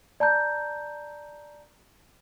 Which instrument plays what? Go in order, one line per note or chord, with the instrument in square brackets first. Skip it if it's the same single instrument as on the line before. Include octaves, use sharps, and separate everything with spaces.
[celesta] D5 A5 A#5 G6